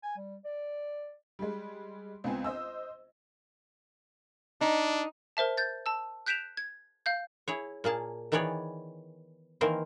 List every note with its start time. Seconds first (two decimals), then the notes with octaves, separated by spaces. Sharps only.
0.03 G#5
0.17 G3
0.45 D5
1.39 G3 G#3
2.24 C#2 B3 C4 G#5
2.44 C5 D#5 E6
4.61 D4 D#4
5.37 A#4 C5 E5 A5
5.57 G6 A6
5.86 A5 E6
6.26 F#6 G6 B6 D7 E7 F7
6.57 G#6
7.06 F5 G6
7.48 E4 G#4 C#5
7.84 A#2 A#3 G#4 A5
8.32 D#3 E3 B3 G#4 C#5 D5
9.61 D#3 E3 A#3 C4 A#4 C5